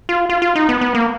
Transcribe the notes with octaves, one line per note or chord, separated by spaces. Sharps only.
F4
F4
F4
D#4
B3
B3
A#3